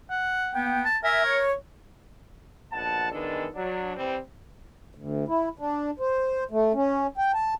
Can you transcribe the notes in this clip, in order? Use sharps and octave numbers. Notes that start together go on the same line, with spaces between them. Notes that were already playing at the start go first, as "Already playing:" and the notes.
F#5
A#3 B3 G5
A5
A#4 E5 G#5
C#5
A#1 B2 F#5 A5
D#3 E3 G#3 B3 D4 A4
F#3 D4
C3 E3 G3 C4
D2
E4
D4
C5
A3
C#4
G5
A5